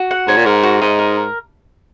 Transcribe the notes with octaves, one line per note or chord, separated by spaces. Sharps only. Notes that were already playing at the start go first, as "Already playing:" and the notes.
Already playing: F#4
F#5
G#2 C#5
A#2
G#2 A#4
F#4
G#2 D#4
A#4